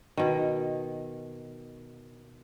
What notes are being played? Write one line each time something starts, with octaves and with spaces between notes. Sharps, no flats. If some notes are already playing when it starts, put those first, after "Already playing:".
B2 D#3